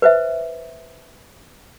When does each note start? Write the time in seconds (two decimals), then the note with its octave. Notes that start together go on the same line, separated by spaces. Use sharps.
0.02 B4 C5 E5